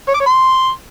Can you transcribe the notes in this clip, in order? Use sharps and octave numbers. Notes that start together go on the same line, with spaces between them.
C#5
D6
C#5
C6